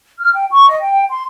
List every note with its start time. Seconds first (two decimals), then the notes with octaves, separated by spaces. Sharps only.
0.18 F6
0.34 G5
0.50 C#6
0.68 D#5
0.80 G5
1.10 C6